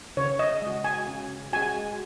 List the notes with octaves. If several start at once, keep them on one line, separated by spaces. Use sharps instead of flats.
C#3 C#5
D#5
G#3 F#4
G#5
C#3
G#3 F#4 G#5